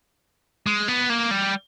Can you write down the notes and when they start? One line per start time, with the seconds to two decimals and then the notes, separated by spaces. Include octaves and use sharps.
0.67 G#3
0.88 B3
1.10 A#3
1.31 G3